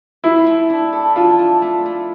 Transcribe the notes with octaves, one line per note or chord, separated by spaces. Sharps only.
E4 C5
A3
D4
A4
D4 F4
D4
A3
A3